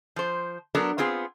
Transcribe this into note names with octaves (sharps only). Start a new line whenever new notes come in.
F3 C5
F#3 B3 D4 A4 A#4
B3 C4 F4 G#4